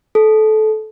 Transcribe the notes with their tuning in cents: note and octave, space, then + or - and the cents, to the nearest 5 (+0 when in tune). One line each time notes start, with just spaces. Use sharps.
A4 -20